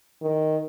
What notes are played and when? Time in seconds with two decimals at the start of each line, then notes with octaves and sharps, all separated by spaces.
0.22 D#3